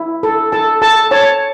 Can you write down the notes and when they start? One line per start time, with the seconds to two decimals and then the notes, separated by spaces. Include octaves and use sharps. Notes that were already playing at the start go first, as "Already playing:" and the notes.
Already playing: E4
0.23 A4
0.52 A4 A5
0.82 A4 A5
1.11 C#5 A5